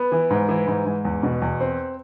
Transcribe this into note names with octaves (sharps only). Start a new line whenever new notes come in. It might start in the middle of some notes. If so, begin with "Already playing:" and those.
Already playing: B3
E3
G#2
E3
G#2
G#2
E2
B2
E2
C4